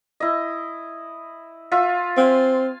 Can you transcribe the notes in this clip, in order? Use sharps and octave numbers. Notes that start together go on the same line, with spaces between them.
E4 D#5
F4 E5
C4 F5 G#5